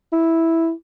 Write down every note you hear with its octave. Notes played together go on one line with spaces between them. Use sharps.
E4